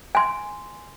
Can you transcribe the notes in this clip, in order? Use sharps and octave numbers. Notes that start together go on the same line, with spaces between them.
G#5 C6